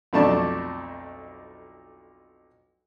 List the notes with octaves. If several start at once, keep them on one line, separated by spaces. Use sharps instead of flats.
B1 F2 A3 D4 A5 C#6